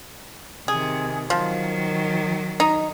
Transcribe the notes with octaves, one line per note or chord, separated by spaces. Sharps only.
C3 D#3 G#4
D#3 F3 F#3
D#4